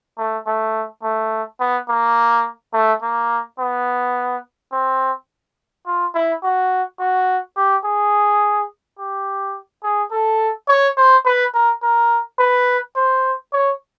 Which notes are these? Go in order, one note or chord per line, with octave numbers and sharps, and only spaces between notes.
A3
A3
A3
B3
A#3
A3
A#3
B3
C4
F4
E4
F#4
F#4
G4
G#4
G4
G#4
A4
C#5
C5
B4
A#4
A#4
B4
C5
C#5